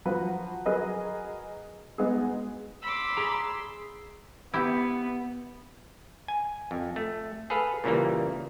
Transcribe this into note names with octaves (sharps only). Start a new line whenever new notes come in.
F3 F#3 F4 F#4 B4
F#3 G#4 A#4 B4 D#5
G#3 B3 D#4 F#4 G#4
B5 C6 D6 E6
G#4 A#5
B3 E4 G4
G#5
F2
A3
G#4 A4 B4 F5
A#2 C#3 E3 G3 A#3